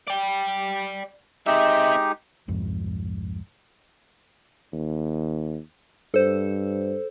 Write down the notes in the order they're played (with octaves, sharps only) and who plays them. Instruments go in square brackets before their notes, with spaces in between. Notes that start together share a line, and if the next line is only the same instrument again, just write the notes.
[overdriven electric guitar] D5 G5
[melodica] G#3 D#4 G4 [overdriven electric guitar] C4 E5
[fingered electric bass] C2 F2 G#2
[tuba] D#2
[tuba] G2 [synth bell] A4 C5